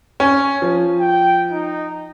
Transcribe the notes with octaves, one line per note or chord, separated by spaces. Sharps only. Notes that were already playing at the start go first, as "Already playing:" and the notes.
C#4
F3
G5
D#4